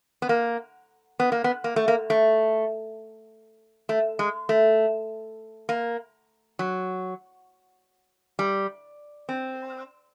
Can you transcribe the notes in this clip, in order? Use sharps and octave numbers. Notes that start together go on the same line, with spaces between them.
B3
A#3
B3
A#3
B3
A#3
A3
A#3
A3
A3
G#3
A3
A#3
F#3
G3
C4